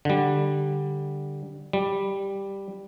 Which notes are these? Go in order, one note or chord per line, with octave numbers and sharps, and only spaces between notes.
D3 G3
G3